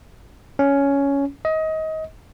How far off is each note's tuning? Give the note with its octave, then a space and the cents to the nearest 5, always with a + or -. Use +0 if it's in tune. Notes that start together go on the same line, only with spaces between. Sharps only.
C#4 +10
D#5 +25